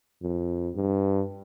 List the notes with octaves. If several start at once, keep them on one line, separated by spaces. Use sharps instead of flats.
F2
G2